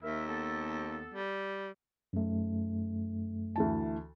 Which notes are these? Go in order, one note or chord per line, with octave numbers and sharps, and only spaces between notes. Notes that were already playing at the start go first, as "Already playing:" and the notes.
D#2 A#4 E5
B3 A4
G3
F#2 A3
D2 E3 A5